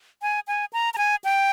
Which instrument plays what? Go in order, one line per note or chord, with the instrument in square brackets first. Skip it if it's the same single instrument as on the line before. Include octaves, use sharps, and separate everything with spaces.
[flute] G#5
G#5
A#5
A#5
G#5
G5